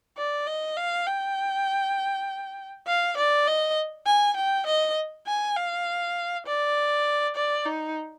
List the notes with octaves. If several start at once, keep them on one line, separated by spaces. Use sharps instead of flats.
D5
D#5
F5
G5
F5
D5
D#5
G#5
G5
D#5
G#5
F5
D5
D5
D#4